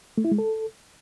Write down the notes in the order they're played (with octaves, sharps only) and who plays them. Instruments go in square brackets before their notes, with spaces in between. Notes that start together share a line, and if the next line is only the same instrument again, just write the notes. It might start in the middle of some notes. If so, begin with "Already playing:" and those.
[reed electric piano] A3
E4
G#3
A4